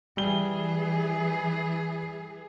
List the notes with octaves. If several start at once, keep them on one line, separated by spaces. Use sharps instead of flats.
E3 G3 G#4 G7